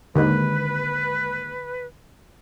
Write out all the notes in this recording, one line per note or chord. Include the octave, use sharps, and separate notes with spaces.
D#2 G#2 D3 B4